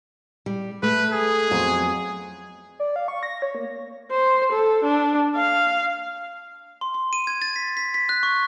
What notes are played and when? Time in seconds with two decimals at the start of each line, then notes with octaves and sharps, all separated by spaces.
0.46 G3
0.83 A3 B4
1.13 G#4
1.51 F2 F#3 B3
2.80 D5
2.96 F5
3.08 C#6
3.23 A#6
3.42 C#5
3.55 A#3
4.11 C5
4.52 A4
4.84 D4
5.36 F5
6.81 C6
6.94 C6
7.13 D#7
7.27 G#6
7.42 A6
7.56 B6
7.77 B6
7.94 B6
8.09 F#6
8.23 C#6